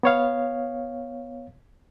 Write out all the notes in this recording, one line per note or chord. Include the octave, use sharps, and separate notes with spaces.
B3 C#5 F5